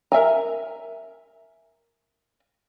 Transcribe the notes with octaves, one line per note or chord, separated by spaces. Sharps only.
A#4 E5 G#5 A#5